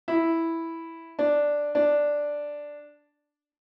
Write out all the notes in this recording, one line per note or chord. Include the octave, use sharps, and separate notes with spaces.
E4
D4
D4